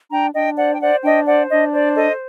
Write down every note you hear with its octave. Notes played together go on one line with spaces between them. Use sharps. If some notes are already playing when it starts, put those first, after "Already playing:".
D4 G5 A#5
D4 D#5 G5
C5 D5 F#5
G5
C5 D5 F#5
D4 D#5 G5
C5 D5 F#5
D4 D#5
C5 D5
A4 D#5